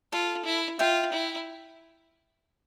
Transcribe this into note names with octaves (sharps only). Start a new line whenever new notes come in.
F4 A4
E4
F4 E5 G5
E4